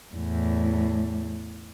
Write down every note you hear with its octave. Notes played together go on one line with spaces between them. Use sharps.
E2 A2